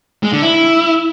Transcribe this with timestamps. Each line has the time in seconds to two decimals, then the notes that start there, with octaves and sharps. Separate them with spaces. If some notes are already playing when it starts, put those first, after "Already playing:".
0.23 G#3
0.33 D3
0.42 E4